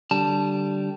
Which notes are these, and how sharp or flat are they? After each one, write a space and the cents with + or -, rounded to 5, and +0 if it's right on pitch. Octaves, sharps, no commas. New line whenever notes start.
D3 +0 G3 -15 A5 +0